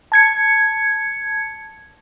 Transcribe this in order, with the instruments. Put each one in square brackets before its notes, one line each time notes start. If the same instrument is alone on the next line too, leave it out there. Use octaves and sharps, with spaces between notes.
[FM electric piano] A5 G#6 C#7